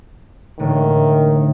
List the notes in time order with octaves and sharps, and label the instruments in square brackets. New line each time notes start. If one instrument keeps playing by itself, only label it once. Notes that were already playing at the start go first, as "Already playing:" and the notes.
[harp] E1 A2 D3 [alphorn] D#3